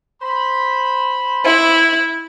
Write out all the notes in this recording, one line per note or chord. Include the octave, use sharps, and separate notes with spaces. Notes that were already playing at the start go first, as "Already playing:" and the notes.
C5 B5
E4